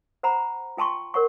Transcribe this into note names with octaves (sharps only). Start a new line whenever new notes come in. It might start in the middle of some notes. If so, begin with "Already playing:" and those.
C5 F#5 A#5 B5
F4 G5 A5 C6 C#6
A#4 C#5 F#5 C#6